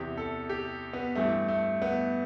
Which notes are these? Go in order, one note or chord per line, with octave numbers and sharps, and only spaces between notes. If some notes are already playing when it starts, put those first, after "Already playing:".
Already playing: E2 C3 E3 G4
A4
G4
B3
G2 E3 A3
A3
B3